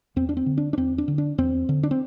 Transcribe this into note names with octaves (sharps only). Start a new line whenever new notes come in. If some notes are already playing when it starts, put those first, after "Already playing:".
E2 C4
D4
C4
D3
D4
D4
E2 C4
D4
D3
D4
E2 C4
D3
D4
C4